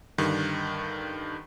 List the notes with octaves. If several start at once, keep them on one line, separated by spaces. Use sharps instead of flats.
G2 D3 D#3